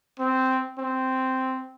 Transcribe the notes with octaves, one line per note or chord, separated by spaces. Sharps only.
C4
C4